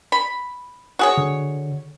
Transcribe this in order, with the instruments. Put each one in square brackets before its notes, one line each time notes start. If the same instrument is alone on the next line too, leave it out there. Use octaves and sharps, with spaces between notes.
[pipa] B5
F#4 G#4 C#5
[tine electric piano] D3